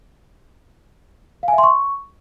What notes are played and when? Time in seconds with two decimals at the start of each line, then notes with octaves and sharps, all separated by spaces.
1.43 F5
1.48 G#5
1.53 E5
1.58 C6
1.63 C#6